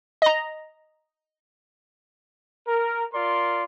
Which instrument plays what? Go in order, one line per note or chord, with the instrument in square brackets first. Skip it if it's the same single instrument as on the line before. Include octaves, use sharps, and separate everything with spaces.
[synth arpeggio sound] D#5 A#5
[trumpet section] A#4
F4 A#4 D5 C6